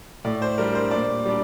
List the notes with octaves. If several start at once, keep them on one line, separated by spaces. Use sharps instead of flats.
A2 D5
C5
G3 D4 A#4
C5
A#2 D5
G3 D4